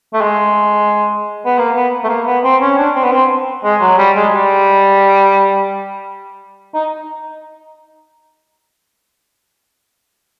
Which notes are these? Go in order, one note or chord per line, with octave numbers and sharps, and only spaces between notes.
A3
G#3
B3
A#3
B3
A3
A#3
B3
C4
C#4
D4
C4
B3
C4
G#3
F#3
G3
G#3
G3
D#4